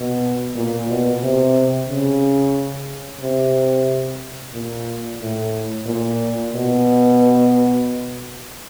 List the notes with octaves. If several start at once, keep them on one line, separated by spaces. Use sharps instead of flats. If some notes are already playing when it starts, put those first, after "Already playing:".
Already playing: B2
A#2
B2
C3
C#3
C3
A#2
A2
A#2
B2